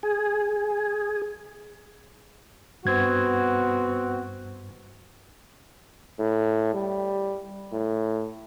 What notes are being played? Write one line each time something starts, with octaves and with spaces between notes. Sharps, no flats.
G#4
G2 B3 C4 F#4 G#6
A2
G3
A2